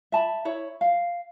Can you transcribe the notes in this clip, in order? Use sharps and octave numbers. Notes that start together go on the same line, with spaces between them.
E5 A5 B5
E4 C#5 B5
F5